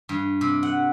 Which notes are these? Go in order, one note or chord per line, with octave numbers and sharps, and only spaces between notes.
G2
C3
F#5